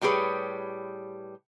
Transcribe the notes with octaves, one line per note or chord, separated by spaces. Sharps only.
A2 G3 G4 G#4 B4 C#5